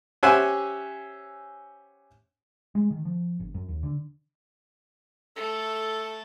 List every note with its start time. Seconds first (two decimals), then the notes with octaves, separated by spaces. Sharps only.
0.23 C#4 G4 C5 E5 F#5 G#5
2.75 G#3
2.91 D#3
3.05 F3
3.40 G1
3.54 F#2
3.68 D#2
3.83 D3
5.36 A3 A4 A5